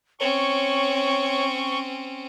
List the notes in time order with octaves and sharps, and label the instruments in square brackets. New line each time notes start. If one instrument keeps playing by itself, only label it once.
[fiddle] C4 C#4 [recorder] C#5 [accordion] C#6